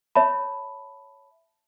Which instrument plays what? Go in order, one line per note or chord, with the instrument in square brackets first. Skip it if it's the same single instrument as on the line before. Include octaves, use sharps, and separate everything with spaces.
[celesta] C#5 E5 A5 B5